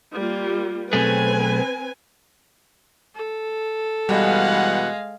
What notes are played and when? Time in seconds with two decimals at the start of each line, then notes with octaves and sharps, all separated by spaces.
0.16 G3 A#3 F4
0.93 B1 A3 C4 G#4 B4 G#5
3.16 A4
4.09 B2 E3 G3 G#3 F5 F#5